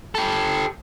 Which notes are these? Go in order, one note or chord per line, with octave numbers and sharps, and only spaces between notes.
G4 A4